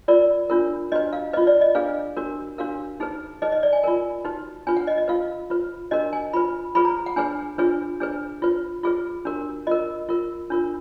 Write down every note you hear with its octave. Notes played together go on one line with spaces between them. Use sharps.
F4 A#4 D5
D4 F4 A#4
D4 F#4 B4 D#5
F5
F4 B4 D#5
D5
D#5
D4 G#4 B4 F5
D4 F#4 A#4
D4 F#4 A#4 F5
D#4 G#4 B4
D#4 G#4 B4 D#5
D#5
D5
G#5
F4 A#4 G#5
D#4 F#4 B4
D4 F4 B4 G#5
F#5
D#5
D#5
F4 B4 F5
F4 B4
D4 F#4 A#4 D#5
G#5
F4 B4 B5
F4 G#4 B4 B5
A#5
F#5
D4 G#4 B4 G#5
D4 F4 G#4 B4
D4 G#4 B4
F4 B4
F4 G#4 B4
D4 F#4 A#4
F4 A#4 D#5
F4 A#4
D4 F4 A#4